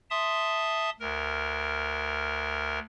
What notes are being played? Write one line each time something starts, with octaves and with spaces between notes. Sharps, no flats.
E5 A5 C6 D#6
D2 A#4